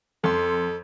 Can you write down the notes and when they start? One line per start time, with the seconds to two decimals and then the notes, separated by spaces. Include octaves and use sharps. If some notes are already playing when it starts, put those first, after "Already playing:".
0.24 F2 A4 C6